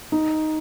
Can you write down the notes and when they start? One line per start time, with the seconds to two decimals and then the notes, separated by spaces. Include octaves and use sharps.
0.12 D#4